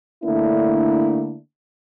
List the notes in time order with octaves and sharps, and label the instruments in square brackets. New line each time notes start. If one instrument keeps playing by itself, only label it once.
[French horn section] D3 A3 A#3 D4 E4